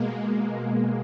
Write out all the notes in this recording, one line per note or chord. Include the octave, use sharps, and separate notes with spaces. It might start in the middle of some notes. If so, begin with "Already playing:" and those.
Already playing: B2 G#3 A#3